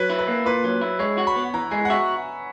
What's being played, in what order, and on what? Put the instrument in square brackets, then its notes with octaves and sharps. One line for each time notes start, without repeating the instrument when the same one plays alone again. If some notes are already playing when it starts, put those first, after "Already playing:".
Already playing: [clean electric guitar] F#3 [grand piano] B4
[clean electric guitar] E4
[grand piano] B4
[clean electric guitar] A#3
[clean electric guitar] A#2 [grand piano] B4
[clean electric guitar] F#3
E4
[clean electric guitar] G#3 [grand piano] C#5
[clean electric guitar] F#4
[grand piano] B5
[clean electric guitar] B3
[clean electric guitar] E3 [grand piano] A#5
[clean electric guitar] G#3 [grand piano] G#5
[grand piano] F#5
[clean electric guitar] F#4 [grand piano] E5